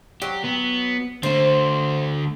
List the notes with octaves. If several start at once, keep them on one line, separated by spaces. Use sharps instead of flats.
F#3 G4
B3
D3 A3 C5